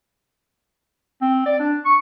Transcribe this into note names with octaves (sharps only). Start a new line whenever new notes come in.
C4
D5
D4
C#6